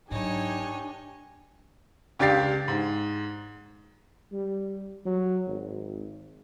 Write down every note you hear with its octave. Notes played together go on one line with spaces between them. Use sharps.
G#2 F#3 D4 D#4 G4 C#5 G#5
C#2 D4 G4 F5 A6 C7
G#2
G3
F#3
G#1